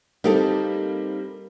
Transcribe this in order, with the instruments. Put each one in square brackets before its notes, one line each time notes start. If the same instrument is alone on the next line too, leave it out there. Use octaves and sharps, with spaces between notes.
[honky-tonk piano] G3 A#3 C4 [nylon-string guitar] D#4 G4 A4